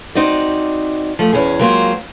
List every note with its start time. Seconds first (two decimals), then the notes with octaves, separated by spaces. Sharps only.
0.15 C4 D#4 F#4 D5
1.19 F3 A3
1.33 E2 C#4 G#4
1.59 F#3 G#3 A#3 C4 F4 C5